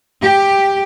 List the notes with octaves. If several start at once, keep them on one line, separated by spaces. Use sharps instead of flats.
G4